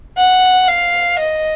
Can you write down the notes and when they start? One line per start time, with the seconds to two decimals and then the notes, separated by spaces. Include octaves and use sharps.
0.17 F#5
0.68 F5
1.18 D#5